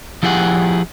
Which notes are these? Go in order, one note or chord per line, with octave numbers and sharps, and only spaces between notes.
F3 E4 G4 G#4 F#5